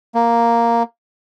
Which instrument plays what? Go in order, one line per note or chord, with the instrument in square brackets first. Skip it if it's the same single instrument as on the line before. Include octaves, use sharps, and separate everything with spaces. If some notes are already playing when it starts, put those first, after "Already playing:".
[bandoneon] A#3